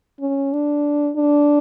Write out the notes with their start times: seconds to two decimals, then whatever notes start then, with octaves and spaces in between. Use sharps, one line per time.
0.20 C#4
0.52 D4
1.16 D4